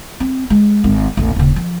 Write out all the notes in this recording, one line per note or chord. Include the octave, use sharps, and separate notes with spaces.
C4
G#3
G#1 G#3
A1 E2
D#1 C#3
F3